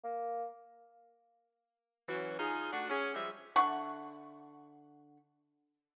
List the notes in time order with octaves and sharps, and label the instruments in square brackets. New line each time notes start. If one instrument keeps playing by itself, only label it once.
[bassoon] A#3
[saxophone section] E3 F#3 C#4 F#4
D#4 F4 G#4
A3 D4 F#4
C#4 G#4
F3 G3 G#3 G#4 E5
[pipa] D3 E5 F#5 C#6